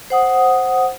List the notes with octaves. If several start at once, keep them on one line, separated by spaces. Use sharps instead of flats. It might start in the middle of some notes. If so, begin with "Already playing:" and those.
C5 F#5 D#6